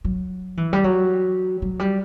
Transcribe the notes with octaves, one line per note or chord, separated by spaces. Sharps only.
F#3
E3
G3
F#3
F#3
G3